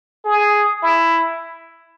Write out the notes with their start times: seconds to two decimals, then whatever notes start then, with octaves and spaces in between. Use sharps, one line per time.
0.25 G#4
0.82 E4